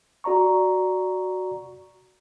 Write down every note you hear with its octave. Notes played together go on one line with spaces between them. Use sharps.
F#4 D5 A#5 C#6